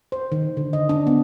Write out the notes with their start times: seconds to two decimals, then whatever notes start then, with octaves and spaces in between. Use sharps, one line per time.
0.12 C5
0.32 D#3
0.57 D3
0.73 D#5
0.89 D4
1.07 B3